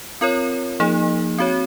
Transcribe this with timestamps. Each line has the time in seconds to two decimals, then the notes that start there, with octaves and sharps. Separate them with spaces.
0.21 C4 F4 A#4 C#5
0.80 F3 A#3 D#4 G#4
1.38 C4 F#4 C#5